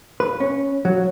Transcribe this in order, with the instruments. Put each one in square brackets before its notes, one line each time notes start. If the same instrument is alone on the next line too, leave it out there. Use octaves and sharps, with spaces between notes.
[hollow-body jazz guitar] B4
C#4
F#3